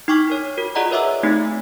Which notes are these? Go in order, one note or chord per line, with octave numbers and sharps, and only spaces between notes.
D#4 G5 C#6 D6 F6 B6
D#4 A#4 C#5
F#4 A#4
F4 G#4 D5 D#5 F#5 A#5
A#4 B4 C#5 E5 D6 E6
A3 C4 D#4 G4